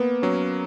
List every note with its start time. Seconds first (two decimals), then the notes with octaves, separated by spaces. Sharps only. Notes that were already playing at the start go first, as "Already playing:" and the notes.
Already playing: A#3 B3
0.22 F#3 C#4